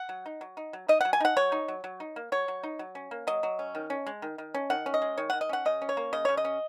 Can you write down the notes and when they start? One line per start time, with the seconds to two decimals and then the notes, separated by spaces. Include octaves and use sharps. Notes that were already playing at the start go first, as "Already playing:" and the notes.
Already playing: F#5
0.09 F#3
0.26 D#4
0.41 F#3
0.57 D#4
0.73 F#3
0.88 D#4 D#5
1.01 F#3 F#5
1.13 G#5
1.20 D#4 F#5
1.37 F#3 C#5
1.52 D#4
1.68 F#3
1.84 F#3
2.00 D#4
2.16 A#3
2.32 F#3 C#5
2.48 F#3
2.64 D#4
2.79 F#3
2.95 C#4
3.11 A#3
3.27 F#3 D#5
3.43 F#3
3.59 C#4
3.75 D#3
3.90 C#4
4.07 G#3
4.22 D#3
4.38 D#3
4.54 C#4
4.70 D#3 F#5
4.86 C#4
4.94 D#5
5.02 G#3
5.18 D#3 C#5
5.30 D#3 F#5
5.41 D#5
5.49 C#4 F#5
5.65 C#3 D#5
5.82 C#4
5.89 C#5
5.97 A#3
6.13 C#3 D#5
6.25 C#3 C#5
6.37 D#5
6.45 C#4